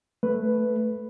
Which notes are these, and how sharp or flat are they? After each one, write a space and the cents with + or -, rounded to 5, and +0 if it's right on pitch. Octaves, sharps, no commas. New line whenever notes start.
A3 +0 B4 +0